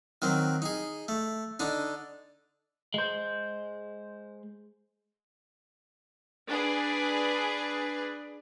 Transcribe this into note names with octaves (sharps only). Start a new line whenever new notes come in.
D#3 F#3 C4
D#4 G#4
A3
D3 D4 D#4
G#3 C5
D4 G#4 B4